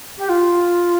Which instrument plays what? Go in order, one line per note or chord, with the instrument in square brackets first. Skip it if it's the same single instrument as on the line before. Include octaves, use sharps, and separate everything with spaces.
[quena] G4
F4